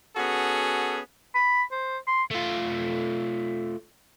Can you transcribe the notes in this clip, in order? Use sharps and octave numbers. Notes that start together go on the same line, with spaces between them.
B3 C#4 F#4 G#4 A4
B5
C5
C6
A3 F4